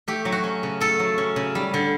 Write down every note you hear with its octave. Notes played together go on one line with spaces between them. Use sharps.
A3 G4
F#3
F#4
C#4
C#3
A3 A4
F#3
C#4
C#3
G3
D3